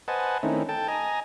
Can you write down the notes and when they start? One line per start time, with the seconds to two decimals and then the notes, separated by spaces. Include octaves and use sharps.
0.08 B4 C5 D#5 F#5 G#5 A5
0.43 D#3 A3 C4 C#4 D#4 E4
0.69 A4 G5 A5
0.88 D#5 G#5 A#5